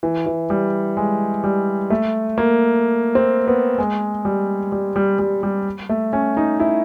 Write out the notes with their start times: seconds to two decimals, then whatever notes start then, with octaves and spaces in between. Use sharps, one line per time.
0.03 E3
0.26 E3
0.50 G3
0.97 G#3
1.44 G3
1.90 A3
2.38 A#3
3.15 C4
3.47 B3
3.78 G#3
4.25 G3
4.72 G3
4.96 G3
5.19 G3
5.43 G3
5.89 A3
6.13 C#4
6.37 D#4
6.60 E4